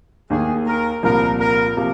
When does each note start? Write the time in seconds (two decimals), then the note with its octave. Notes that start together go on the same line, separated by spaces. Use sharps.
0.30 D#2 D#3 A#3 G#4
0.66 A#4
1.03 C2 A#2 F3 A#4
1.40 A#4
1.77 C3 F3 A#3